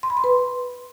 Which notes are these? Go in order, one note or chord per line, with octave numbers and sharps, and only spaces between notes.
C6
B5
C6
B4